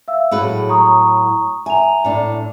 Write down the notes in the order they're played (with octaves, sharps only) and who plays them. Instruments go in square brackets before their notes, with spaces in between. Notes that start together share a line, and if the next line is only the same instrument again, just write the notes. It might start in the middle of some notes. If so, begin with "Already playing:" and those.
[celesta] E5 F5 E6
[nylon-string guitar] A2 F#3 B4 [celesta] G#4
[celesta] A#5 C#6 D#6
[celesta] E5 A#5 F7 [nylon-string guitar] G#5
[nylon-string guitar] A2 D4